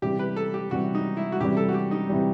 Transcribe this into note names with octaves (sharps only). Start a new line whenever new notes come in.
C3 E3 G3 G4
B4
A4
G4
C3 E3 G3 F#4
D#4
E4
F#4
C3 E3 G3 G4
A4
F#4
G4
D#4
C3 E3 G3